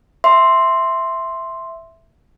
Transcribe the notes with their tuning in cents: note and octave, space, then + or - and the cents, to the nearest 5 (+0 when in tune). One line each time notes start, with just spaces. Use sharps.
E5 +0 C6 +0